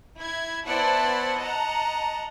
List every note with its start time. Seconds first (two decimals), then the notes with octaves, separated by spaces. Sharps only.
0.19 E4 G#6
0.66 B3 E4 C5 D5 F#5 A5
1.38 D#5 F#5 A5 A#5